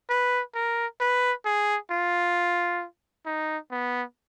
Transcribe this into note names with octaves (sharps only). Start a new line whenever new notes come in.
B4
A#4
B4
G#4
F4
D#4
B3